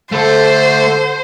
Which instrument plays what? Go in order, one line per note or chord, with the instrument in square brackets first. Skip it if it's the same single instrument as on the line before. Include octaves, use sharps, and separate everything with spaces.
[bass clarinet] D3 [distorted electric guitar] A3 A4 [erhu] C5